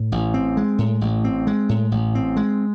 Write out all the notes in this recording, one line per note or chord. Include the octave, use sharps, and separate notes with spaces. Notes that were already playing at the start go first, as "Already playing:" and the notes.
Already playing: A2
A1
C4
G#3
A2
A1
C4
G#3
A2
A1
C4
G#3